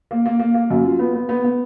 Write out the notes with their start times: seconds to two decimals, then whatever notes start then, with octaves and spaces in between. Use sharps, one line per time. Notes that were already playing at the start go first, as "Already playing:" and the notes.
0.11 A#3
0.26 A#3
0.39 A#3
0.54 A#3
0.71 F#2
0.84 F4
0.99 B3
1.14 B3
1.29 B3
1.44 B3